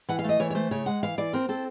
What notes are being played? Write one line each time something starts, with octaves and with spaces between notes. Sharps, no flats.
E3 F#5
F5
A3 D#5
E3 C#5
C#5
A3 C5
C#3 C#5
G#3 F#5
E3 F5
E3 D5
C4 A#4
C4 A4